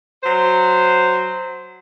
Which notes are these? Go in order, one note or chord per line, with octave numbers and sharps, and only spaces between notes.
F#3 C5